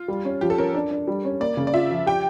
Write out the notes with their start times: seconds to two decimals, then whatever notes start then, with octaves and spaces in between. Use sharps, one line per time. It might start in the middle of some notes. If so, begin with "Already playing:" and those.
Already playing: F4
0.08 G3
0.25 C#4
0.41 F3 G4
0.50 A4
0.58 C#4 A#4
0.74 D4
0.91 D4
1.07 G3
1.25 C#4
1.40 A#3 D5
1.57 C#3
1.67 D5
1.74 F4 E5
1.91 F3
2.06 G4 G5